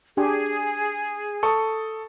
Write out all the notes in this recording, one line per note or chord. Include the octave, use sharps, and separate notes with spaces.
D4 G4 G#4 G#5
A4 C#6 D#6